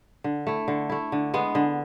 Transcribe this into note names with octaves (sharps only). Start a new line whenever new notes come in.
D3
A3 E4
D3
A3 E4
D3
G#3 B3
D3